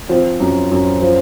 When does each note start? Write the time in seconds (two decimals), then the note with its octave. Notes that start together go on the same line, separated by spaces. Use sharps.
0.09 F3 C4
0.40 F#2
0.71 F#2
1.02 F3